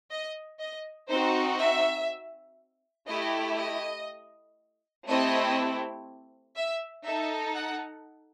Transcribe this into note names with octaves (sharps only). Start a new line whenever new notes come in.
D#5
D#5
C4 D#4 F#4 C5
E5
A3 E4 G4 D#5
D#5
A3 C4 E4 G4 D#5
E5
D#4 A4 E5
F#5